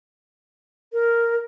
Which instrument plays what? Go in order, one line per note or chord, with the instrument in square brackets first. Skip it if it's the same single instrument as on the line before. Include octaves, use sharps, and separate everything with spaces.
[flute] A#4